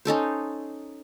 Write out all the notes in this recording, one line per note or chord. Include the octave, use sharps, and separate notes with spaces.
C#4 D#4 A4 C5